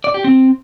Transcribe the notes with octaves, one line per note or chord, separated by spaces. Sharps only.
D5
G4
C4